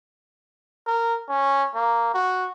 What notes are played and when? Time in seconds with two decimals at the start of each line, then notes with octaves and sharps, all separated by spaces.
0.87 A#4
1.29 C#4
1.75 A#3
2.14 F#4